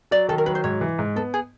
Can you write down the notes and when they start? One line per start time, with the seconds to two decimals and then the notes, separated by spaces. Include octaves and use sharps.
0.11 F#3 D5
0.29 D#3 A4
0.38 A#4
0.46 F#3 B4
0.55 C5
0.64 G#2 C#5
0.81 E3
0.99 G#2
1.16 B3 A4
1.34 G#4